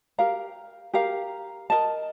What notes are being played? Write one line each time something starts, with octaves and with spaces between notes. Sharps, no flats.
G4 A#4 F5 A#5
G4 A#4 F5 A#5
A#4 D#5 A5